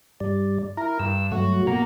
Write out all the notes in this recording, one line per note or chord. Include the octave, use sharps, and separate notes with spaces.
G2 G3 D5
E4 A#4
G2 E6
G2 F#3 A3 F#4
B2 A#3 F#5 A#5